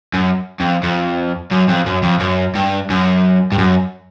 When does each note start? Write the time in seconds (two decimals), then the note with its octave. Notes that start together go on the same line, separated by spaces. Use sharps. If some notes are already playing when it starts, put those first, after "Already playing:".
0.14 F#2
0.60 F2
0.83 F2
1.51 F#2
1.68 F2
1.86 F#2
2.03 F2
2.20 F#2
2.55 G2
2.90 F#2
3.52 G2
3.58 F#2